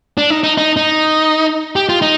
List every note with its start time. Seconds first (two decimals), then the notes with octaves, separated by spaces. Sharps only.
0.18 D4
0.30 D#4
0.43 D#4
0.58 D#4
0.77 D#4
1.76 G4
1.89 F4
2.02 D#4